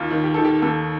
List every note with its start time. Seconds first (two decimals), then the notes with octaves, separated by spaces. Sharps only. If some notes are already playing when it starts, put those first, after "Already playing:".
Already playing: D#2 D#3 F4
0.11 D#3
0.24 G4
0.34 D#3 A4
0.44 G4
0.62 D#2 A4